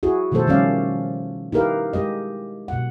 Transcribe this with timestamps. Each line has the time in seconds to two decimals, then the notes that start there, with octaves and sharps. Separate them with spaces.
0.03 E4 F#4 G#4
0.32 B2 D#3 F3 A3 A4 C5
0.47 D#3 F3 G3 C#4 D5 F5
1.52 D#4 E4 G4 A#4 B4 F5
1.93 G#3 G4 D#5
2.68 B2 F#5